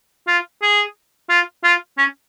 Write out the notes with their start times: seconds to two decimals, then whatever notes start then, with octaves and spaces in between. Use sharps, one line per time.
0.28 F4
0.62 G#4
1.30 F4
1.64 F4
1.98 C#4